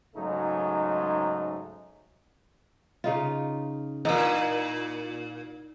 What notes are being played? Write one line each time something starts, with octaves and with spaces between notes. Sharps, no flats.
G#2 C#3 F#3 G#3 A3 D#4
C#3 D#4 F4
E2 A#2 D#4